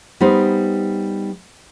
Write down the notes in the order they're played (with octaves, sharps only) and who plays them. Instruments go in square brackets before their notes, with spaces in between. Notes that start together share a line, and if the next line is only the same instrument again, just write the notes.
[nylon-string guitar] G3 B3 D#4 C5